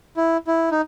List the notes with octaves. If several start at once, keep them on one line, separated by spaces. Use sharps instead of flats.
E4
E4
D#4